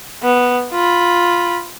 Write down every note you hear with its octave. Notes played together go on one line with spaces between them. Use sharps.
B3
F4 B5